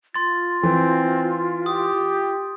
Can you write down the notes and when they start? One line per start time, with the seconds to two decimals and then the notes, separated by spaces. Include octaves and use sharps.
0.14 F4 C6 A6
0.63 E3 C4
1.66 G4 D#6